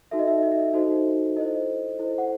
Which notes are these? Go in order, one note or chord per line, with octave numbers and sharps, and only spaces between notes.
D#4 F#4 A4 E5
D#5
E5
D#5
E5
D#5
D#4 F#4 A4 C5
E4 A4 C5 D#5
E4 A4 C5
F#5